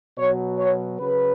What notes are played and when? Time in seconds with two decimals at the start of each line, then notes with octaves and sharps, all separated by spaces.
0.18 B2 F#3 C#5
0.59 C#5
0.99 C#3 F#3 B4